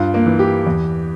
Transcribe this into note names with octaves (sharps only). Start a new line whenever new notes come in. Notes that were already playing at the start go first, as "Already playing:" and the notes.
Already playing: G2 F4
A#3
E3
G4
E2